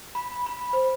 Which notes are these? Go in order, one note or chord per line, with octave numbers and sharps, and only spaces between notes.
B5
B5
C5